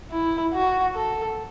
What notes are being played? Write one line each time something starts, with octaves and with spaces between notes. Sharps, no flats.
E4
F#4
A4